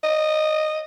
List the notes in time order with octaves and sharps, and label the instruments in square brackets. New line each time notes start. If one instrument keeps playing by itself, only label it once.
[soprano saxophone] D#5